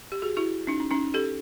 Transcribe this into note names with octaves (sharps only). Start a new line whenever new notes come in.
G4
F#4 G#4
E4 F#4
C#4 D#4
C#4
C#4 D#4
G4 A4